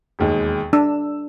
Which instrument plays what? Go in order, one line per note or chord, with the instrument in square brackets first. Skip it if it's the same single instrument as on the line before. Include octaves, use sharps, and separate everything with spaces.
[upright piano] E1 D#2 G#3
[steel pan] D4 [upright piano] E6